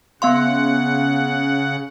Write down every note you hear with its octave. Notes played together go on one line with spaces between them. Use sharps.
C#3 B3 F5 F#5 C6